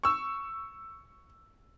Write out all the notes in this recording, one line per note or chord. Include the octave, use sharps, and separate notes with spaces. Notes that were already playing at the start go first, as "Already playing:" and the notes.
C#6 E6